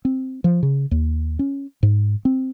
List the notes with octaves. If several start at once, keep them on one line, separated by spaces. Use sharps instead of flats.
C4
F3
C#3
D#2
C#4
G#2
C4